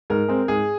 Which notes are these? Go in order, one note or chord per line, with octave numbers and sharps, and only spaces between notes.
G#2 A#4
G#3 C4
G#2 G#4